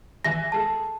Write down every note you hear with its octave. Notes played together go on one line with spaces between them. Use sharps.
E3 E5 G#5 A#6
G#3 G#4 A4 A5